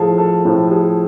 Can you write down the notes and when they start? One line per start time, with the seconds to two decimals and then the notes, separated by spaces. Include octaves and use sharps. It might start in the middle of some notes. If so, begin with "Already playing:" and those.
Already playing: A2 F3 G#4 A4
0.18 A4
0.45 A2 F3
0.71 G#4